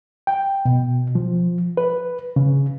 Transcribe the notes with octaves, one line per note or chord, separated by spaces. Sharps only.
G5
B2
F3
B4
C#3